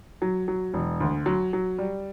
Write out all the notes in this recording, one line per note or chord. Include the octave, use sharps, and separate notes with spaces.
F#3
F#3
E1
D2
F#3
F#3
G3